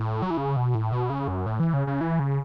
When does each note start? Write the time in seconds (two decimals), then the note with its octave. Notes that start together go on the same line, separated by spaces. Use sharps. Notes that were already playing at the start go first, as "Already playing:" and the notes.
Already playing: A2
0.22 F#3
0.30 E3
0.37 C#3
0.56 B2
0.75 A2
0.92 B2
1.10 C#3
1.28 F#2
1.46 A2
1.60 E3
1.74 C#3
1.87 C#3
2.01 E3
2.19 C#3